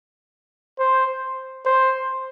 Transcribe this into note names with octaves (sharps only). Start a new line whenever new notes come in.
C5
C5